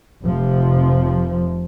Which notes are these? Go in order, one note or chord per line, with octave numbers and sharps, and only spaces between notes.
F1 C3 F3